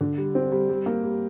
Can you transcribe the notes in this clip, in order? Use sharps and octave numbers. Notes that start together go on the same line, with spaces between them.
D3
G3
C4
G3
G3
A#3
G3